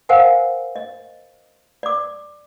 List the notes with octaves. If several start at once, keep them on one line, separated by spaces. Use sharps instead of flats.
A#4 C5 F5 F#5 G#5
D#5
D5 D6